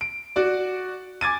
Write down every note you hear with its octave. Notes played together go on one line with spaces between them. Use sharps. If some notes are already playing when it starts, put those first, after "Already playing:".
D7
F#4 D5
G#5 D6 G#6 A6 D#7